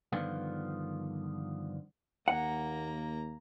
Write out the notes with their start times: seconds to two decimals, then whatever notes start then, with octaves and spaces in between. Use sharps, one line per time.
0.12 G2 D3 D#3 F3 B3 F4
2.28 D#2 A#3 F#5 A#5